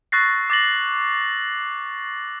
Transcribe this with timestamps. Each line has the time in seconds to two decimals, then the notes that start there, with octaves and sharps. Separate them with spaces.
0.12 C#6 E6 F#6 A6 A#6 C7
0.50 D6 A6 A#6 F#7